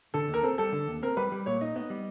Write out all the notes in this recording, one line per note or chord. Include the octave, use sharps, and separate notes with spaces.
D3 A4
D#2
A#4
C4 A4
G3 A4
D3
D#2
C4 A#4
G3 B4
G3
A#2 C#5
D#4 D#5
B3 D#5
G3